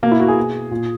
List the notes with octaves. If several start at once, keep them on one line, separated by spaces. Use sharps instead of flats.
B2 A#3
E4
F#4
G#4
B2
A#2